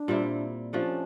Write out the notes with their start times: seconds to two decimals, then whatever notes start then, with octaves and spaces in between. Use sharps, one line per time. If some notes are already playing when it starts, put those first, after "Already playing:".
Already playing: D4
0.08 A#2 G3 C4 E4
0.73 F3 A3 C#4 D4 G4